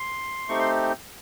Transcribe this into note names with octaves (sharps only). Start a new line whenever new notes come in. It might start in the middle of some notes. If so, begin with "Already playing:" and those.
Already playing: C6
A3 C4 D#4 G4 C#6
C6